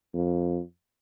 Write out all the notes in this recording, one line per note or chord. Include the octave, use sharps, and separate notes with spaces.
F2